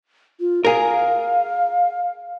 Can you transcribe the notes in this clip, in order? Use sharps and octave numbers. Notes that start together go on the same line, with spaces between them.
F4
G#4 A#4 F5